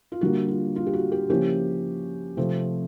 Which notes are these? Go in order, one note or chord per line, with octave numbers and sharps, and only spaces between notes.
F4
D3 G3 A#3 F#4
F4
F4
G4
F#4
G4
C#3 F3 A#3 C#4 E4 G4
C3 F3 A3 C4